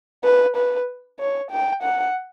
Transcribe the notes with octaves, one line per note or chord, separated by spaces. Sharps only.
B4
B4
C#5
G5
F#5